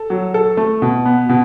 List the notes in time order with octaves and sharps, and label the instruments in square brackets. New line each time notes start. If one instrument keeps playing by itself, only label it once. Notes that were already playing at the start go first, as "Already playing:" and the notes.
Already playing: [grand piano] A4
F#3
A4
A3
B2
B3
B2